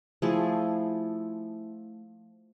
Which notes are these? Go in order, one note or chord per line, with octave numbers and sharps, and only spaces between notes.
F3 A3 E4 G#4